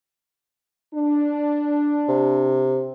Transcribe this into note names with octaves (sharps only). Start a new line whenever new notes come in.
D4
C3